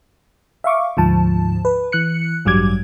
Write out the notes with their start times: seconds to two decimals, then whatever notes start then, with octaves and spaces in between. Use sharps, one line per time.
0.64 E5 F5 C#6 D6
0.97 D2 G#2 F3 A5
1.65 B4
1.92 E3 F#6 C#7
2.45 A1 G2 F#3 G3 D6 G#6